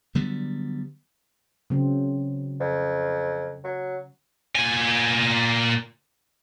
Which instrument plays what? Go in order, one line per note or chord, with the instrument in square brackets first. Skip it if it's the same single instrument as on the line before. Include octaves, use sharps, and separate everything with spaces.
[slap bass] D3 F#3 G3 B3
[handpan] C#3 F#3 C4
[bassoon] F2
F#3
[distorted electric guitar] A#2 G#5